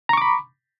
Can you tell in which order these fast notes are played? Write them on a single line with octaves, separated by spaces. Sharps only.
A#5 C#6 D6 B5